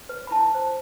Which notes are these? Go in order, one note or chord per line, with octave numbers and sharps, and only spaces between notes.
B4
B5
E4 A5
C5